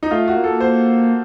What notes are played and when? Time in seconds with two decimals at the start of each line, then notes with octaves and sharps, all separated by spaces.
0.03 D#4
0.11 A3 F4
0.28 F#4
0.36 A#3
0.44 A4
0.60 C5